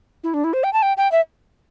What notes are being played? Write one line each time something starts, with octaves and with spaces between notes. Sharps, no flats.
E4
D4
E4
C5
G5
A5
G5
G5
E5